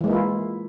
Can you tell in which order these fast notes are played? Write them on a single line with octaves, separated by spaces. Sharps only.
E3 G#3 A#3 E4 F4